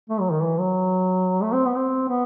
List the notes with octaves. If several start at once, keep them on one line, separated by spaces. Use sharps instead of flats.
A3
F#3
D#3
E3
F#3
A3
C4
B3
C4
B3